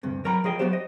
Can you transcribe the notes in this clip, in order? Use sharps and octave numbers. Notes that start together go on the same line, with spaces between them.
D2 G2 C3
F#3 A#4 G5 A#5 B5
F3 G#4 D#5 G5
F#3 B3 F#4 G4 C5
D#5